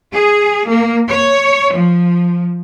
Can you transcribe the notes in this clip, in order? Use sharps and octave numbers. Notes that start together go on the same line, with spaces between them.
G#4
A#3
C#5
F3